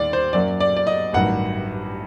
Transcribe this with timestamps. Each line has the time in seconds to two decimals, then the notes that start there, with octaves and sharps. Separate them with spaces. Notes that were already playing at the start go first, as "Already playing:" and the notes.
Already playing: D#2 D#3 G3 A#3 D5
0.13 C5
0.33 F#2 F#3 A#3 D5
0.60 D5
0.77 D5
0.87 D#5
1.13 A1 G2 D#3 F#3 F#5